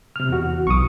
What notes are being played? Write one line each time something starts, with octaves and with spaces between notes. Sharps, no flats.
C3 F6
E2 F#4
B1 C#6 D#6